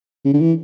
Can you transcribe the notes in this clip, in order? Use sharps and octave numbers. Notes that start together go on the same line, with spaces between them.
C#3
D3
E3